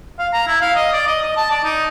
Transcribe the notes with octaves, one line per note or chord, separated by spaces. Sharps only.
F5
A#5
E4
F5
D#5
D5
D#5
D#5
A5
D5
D#4